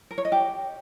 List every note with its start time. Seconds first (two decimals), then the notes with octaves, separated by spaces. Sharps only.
0.11 A#4
0.18 C#5
0.25 D#5
0.32 G4